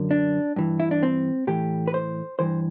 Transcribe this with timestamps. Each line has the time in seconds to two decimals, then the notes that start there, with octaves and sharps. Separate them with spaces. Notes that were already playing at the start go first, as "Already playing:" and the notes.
Already playing: F#2 D3
0.11 D4
0.56 G2 E3
0.80 E4
0.91 D4
1.03 C4
1.47 A2 E3 G4
1.88 B4
1.94 C5
2.39 G2 E3 C5